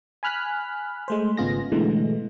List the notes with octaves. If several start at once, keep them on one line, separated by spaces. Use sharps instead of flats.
G#5 B5 F6 F#6 B6
G#3 A3 C5
G#1 C#3 B3 F4 G#4 A#6
B2 D3 E3 G#3 A3